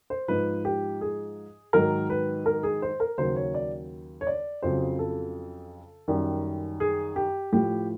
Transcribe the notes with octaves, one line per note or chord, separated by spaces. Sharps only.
C5
G#2 F3 B4
G4
G#4
G#2 D#3 F#3 A#4
B4
A#4
G#4
C5
A#4
D#2 C#3 F#3 C5
C#5
D5
C#5
D5
F2 C#3 F#3 C5
A4
F#2 D#3 G3
G#4
G4
A2 F3 G4